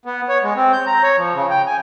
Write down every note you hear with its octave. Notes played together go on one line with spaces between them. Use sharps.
B3
C#5
G#3
C4
G6
A#5
C#5
F3
C#3
G5
G#5